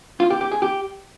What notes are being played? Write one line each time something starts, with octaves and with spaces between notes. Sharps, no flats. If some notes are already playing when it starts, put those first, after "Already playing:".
F4
G4
G4
G#4
G4